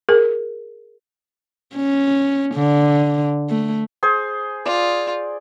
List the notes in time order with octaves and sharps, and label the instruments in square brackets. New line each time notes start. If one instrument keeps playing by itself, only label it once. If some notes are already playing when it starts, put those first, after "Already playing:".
[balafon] G#4 A#4
[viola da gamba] C#4
D3
A3
[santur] G#4 C5
[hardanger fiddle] F4 [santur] D5